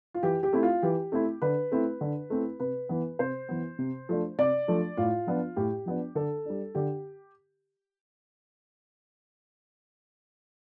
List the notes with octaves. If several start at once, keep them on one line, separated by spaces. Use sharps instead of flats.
F4
E3 G4
G4
A3 C4 E4
F4
E3 G4
A3 C4 E4
D3 B4
A3 C4 E4
D3
A3 C4 E4
C3 B4
E3 B3
C3 C5
E3 B3
C3
F3 A3 D4
C3 D5
F3 A3 D4
A2 F4
F3 B3 D4
A2 G4
F3 B3 D4
D3 A4
G3 D4
D3 G4